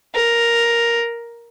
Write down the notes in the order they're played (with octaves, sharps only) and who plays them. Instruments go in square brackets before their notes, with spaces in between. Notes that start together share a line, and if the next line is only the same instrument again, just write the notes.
[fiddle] A#4